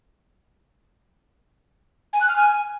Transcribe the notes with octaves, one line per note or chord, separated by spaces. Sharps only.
G#5
F#6
F6
G#5